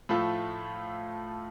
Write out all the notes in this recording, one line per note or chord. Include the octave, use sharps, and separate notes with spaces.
A2 F3 A3 F4 A4